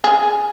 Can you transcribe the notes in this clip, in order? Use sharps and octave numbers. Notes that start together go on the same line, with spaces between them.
G#4